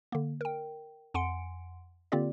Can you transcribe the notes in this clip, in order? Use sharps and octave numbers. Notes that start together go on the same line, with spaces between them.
D3 A#3
A#4 G5
F2 F#5 G#5 C6 C#7 D7
D3 A#3 C4 F4 G4 D5